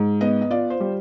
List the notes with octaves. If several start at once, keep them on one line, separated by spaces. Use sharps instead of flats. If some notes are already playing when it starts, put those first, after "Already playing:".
Already playing: G#2
B3 D#5
D#5
F4 D5
C5
G3